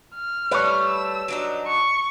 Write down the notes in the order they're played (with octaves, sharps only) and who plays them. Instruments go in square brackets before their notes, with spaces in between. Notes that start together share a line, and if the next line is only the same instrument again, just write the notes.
[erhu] F6
[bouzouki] G3 A3 [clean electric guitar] B4 C#5
[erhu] E6
[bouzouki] F#3 D4 D#4
[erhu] C#6